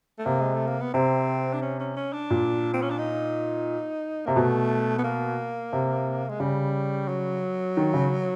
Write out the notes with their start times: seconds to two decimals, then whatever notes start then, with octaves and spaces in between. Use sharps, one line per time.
0.19 A3
0.26 C3 A#3
0.41 G#3
0.54 A3
0.67 A#3
0.81 B3
0.94 C3 C4
1.53 D4
1.62 C#4
1.80 C#4
1.97 C#4
2.13 D4
2.30 A#2
2.74 C4
2.82 C#4
2.90 D4
2.98 D#4
4.26 C3 A#3
4.35 B2 A3
4.98 B3
5.04 A#3
5.73 C3
6.29 G#3
6.40 C#3 G3
7.08 F#3
7.77 D#3
7.94 C#3